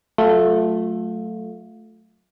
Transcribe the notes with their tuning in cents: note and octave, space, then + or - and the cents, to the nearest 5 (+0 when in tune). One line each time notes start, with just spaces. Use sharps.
F#3 +0 A3 +0 F4 +25